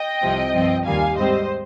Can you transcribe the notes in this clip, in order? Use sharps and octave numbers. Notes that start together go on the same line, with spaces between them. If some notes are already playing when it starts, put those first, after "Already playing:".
Already playing: D#5 G5
C2 C3 F3 C4
G2 F3 C4
D#2 D#3 G3 F5 G#5
G#2 G3 C4 C5 D#5